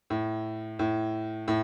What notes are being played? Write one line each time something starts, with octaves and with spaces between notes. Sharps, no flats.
A2
A2
A2